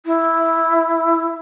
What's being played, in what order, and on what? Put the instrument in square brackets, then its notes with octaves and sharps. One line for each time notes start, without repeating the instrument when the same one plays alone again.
[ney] E4